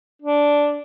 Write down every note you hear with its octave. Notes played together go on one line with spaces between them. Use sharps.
D4